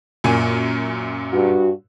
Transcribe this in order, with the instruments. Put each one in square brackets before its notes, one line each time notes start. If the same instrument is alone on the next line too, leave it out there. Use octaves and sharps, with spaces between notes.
[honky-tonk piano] F#2 A#2 G#5
[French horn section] G2 F#4